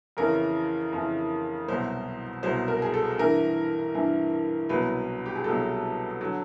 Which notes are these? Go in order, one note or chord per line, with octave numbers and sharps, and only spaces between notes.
F2 C#3 E3 A#4
F2 C#3 E3
C2 B2 F#3 C5
C2 B2 F#3 C5
A#4
G#4
A4
G2 E3 A#4
G2 E3
C2 B2 F#3 B4
G4
G#4
C2 B2 F#3 A4
D3 F#3